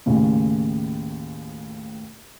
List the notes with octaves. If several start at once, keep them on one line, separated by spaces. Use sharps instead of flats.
D#2 A2 C#3